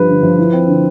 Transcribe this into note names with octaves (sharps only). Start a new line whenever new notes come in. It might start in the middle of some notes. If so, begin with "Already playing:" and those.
Already playing: G2 F3 B4
D3
F3
E4
C4
D3